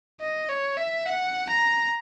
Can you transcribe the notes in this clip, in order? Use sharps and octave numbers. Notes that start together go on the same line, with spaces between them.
D#5
C#5
E5
F#5
A#5